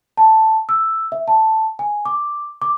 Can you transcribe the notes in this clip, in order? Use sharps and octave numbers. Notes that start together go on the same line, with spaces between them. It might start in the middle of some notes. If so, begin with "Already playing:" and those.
A5
E6
E5
A5
G#5
D6
D6